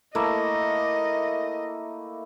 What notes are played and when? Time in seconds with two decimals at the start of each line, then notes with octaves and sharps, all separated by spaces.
0.15 A3 A#3 E4 D#5